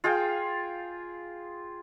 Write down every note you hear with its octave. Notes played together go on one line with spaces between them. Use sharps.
F4 G#4 F5 G5